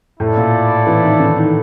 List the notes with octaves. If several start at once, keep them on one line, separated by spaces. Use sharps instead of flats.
A2 E4 A4 D5
A#2
E3
D#3
D3
D#3